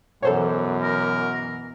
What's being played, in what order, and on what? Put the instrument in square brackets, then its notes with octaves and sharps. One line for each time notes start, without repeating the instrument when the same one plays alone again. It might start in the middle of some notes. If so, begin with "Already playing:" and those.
[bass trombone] F#2 [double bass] B2 E3 [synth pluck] A4 C5 C#5
[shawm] A#4